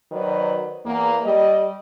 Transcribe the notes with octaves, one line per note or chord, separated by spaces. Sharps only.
D#3 F#3 B4 C5 D5
E2 A#3
G3 D#5